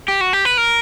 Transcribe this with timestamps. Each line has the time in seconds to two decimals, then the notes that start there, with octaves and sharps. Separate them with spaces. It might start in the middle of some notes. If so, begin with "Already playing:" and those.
0.08 G4
0.21 F#4
0.33 G4
0.45 B4
0.57 A#4